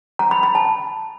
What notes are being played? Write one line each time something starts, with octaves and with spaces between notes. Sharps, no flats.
A#5
B5
B5
A5